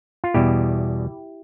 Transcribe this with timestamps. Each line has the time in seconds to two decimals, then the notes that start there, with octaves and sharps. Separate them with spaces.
0.24 F4
0.34 E2 B2 G3 E4 G4